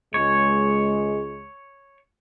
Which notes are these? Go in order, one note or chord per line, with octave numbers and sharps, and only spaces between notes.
C#2 G#3 C#5